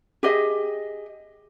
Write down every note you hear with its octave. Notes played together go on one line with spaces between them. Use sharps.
G4 G#4 D#5 E5